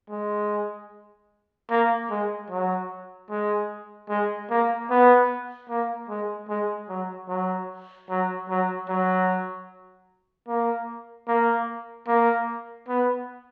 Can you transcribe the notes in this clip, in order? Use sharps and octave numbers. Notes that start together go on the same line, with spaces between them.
G#3
A#3
G#3
F#3
G#3
G#3
A#3
B3
A#3
G#3
G#3
F#3
F#3
F#3
F#3
F#3
A#3
A#3
A#3
B3